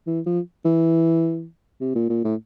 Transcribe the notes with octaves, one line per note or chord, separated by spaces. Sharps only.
E3
F3
E3
C3
A#2
A#2
A2